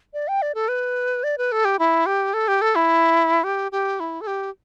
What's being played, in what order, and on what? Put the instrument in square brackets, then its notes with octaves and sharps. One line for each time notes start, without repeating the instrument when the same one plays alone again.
[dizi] D5
G5
D5
A4
B4
D5
B4
A4
G4
E4
G4
A4
G4
A4
E4
G4
G4
E4
A4
G4